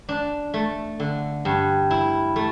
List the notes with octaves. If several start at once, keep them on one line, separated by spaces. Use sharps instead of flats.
D4
A3
D3
G2
E4
A3